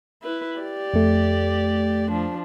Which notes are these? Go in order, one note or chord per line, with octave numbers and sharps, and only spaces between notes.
E4 B4
G4 D5
F2 A3
F3 D4